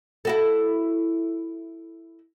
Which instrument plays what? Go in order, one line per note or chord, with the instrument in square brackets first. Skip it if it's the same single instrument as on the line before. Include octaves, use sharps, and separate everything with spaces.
[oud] E4 F#4 A4